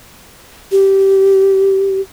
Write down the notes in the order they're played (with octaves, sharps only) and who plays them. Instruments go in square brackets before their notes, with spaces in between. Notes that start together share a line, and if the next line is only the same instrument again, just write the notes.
[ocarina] G4